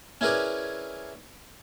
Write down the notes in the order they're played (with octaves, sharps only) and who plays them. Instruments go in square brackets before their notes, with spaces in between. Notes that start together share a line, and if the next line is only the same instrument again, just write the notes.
[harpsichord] C#4 E4 G#4 A#4 B4 D5